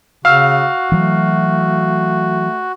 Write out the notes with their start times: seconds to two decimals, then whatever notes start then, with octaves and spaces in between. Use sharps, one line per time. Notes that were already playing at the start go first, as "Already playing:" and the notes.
0.25 C#3 F#4 F5 E6 F6
0.92 E3 F#3 A3